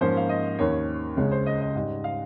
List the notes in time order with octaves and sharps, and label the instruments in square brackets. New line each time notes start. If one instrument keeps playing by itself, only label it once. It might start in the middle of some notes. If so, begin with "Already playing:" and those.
[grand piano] G#2 F3 A#3 C#4 C5
F5
D#5
D#2 D#3 A#3 C#4 C#5
C#2 C#3 G#3 C#4 C#5
C5
D#5
D#5
G#2 G3 C#4 D#5
F5